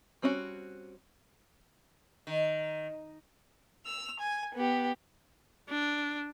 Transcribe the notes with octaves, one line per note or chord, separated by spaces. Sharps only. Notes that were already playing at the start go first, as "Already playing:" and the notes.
G3 C4 C#4 D#4 F#4
D#3
E6 F7
G#5
B3 G4
D4